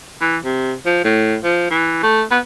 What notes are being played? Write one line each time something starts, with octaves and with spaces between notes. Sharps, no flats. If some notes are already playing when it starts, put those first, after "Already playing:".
E3
C3
F3
A2
F3
E3
A3
B3